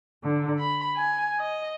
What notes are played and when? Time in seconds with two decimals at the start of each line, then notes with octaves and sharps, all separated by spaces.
0.23 D3
0.59 B5
0.97 G#5
1.39 D#5